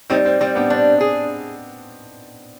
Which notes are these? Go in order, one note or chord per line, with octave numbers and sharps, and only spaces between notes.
G3 C4 D#4
C4
G3 C4
B3 D4
C4 D4
G#4